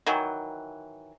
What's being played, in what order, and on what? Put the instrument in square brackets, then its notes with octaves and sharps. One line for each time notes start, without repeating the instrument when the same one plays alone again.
[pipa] D#3 E3 F#3